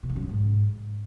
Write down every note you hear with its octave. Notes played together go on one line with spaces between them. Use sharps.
B2
D#3
F#2
A#2
G#2